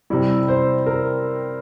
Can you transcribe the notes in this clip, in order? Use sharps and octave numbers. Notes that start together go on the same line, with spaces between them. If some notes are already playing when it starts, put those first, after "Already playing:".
C3 G3 E4
C5
A#4